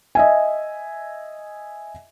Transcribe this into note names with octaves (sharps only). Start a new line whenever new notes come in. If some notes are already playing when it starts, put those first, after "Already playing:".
D#5 E5 G#5